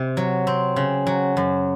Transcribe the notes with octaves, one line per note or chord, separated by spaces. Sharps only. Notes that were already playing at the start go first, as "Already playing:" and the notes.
Already playing: C3 C4
F#3
C4
C#3
F#3
F#2